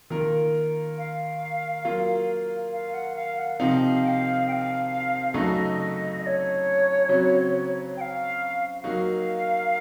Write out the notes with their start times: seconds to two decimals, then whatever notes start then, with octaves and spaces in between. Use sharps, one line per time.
0.10 D#3 A#3 F4 A#4
0.97 F5
1.85 F#3 A#3 F4
2.72 F5
2.93 F#5
3.15 F5
3.38 F#5
3.59 C3 F3 C4 D#4 F5
4.03 G5
4.08 F5
4.47 G5
4.52 F5
5.34 F#2 C#3 A3 D#4 F#4 D#5
5.78 D#5
6.21 D#5
6.26 C#5
7.09 C#3 F#3 C4 F#4
7.97 G5
8.01 F5
8.84 F#3 A#3 D#4 F#4 F5